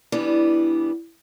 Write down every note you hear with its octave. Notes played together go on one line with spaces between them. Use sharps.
E3 G3 B3 D4